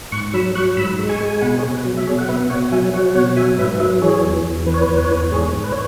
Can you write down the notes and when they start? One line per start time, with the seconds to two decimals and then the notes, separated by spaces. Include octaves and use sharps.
0.12 G#2 C#6 F#6
0.33 F#3 B5 E6
0.55 F#3 C#6 F#6
0.77 G#2 B5 E6
0.99 G#3
1.09 G#5 C#6
1.21 G#3
1.30 G#5
1.41 B2 F#5 B5
1.58 G#4 C#5
1.64 B2
1.75 B4
1.85 F#3
1.97 E5
2.07 B2 G#4 C#5
2.18 F#5
2.28 B2 B4 E5
2.50 B2 C#5 F#5
2.72 F#3 E5 G#5
2.93 F#3 C#5 F#5
3.15 B2 C#5 F#5
3.37 F#3 E5 G#5
3.58 G#2 B4 E5
3.80 F#3 B4 E5
4.02 E3 G#4 C#5
4.24 E2
4.45 E2
4.66 E3 B4
4.74 C#5
4.82 B4
4.88 E2 C#5
4.97 B4
5.05 C#5
5.10 E2 B4
5.31 G#2 G#4 C#5
5.53 G#2
5.64 B4
5.72 C#5